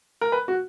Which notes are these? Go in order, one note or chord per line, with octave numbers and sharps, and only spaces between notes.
A#4
B4
F#4